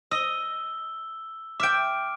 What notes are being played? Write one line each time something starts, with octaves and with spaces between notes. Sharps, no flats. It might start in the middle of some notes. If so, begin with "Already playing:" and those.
D#5 E6 G7
E5 G5 D6 F6 D7